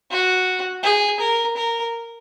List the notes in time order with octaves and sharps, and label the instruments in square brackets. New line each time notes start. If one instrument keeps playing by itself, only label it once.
[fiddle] F#4
G#4
A#4
A#4